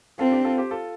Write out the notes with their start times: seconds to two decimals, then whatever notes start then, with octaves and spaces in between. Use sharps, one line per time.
0.19 C4 F4 A4
0.32 D4 G4
0.45 F4 A4
0.58 G4 C5
0.71 F4 A4